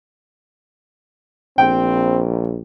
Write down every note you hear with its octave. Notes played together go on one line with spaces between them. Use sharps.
A#1 C4 G5